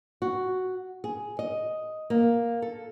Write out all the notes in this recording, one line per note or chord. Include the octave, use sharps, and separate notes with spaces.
F#4
G#4
D#5
A#3
A4